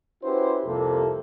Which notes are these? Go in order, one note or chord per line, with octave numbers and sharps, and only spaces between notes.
C#4 E4 F#4 G4 B4 C5
C2 F2 C3 A#3 A4